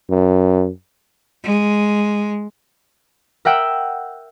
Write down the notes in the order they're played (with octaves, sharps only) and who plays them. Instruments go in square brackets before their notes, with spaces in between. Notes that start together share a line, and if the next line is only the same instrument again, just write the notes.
[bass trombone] F#2
[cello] G#3
[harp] A#4 E5 F#5 G5 E6